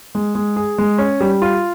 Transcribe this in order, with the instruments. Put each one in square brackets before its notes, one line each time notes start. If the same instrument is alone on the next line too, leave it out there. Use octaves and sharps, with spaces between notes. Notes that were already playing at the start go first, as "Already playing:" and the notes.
[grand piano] G#3
G#3
G#4
G#3
C#4
G3
F4